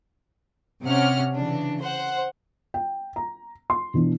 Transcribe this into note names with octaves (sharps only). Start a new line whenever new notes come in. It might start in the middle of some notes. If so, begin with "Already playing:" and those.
C3 C#4 F#5 F6
C#3 E3 D4
C5 F#5
G5
A#5
C6
B2 E3 D4